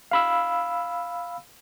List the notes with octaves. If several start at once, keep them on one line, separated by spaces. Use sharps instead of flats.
F5 B5 E6